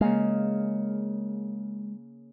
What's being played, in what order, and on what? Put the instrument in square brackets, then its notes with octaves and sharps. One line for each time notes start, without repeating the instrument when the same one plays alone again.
[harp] C#3 A#3 F5 [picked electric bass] G#3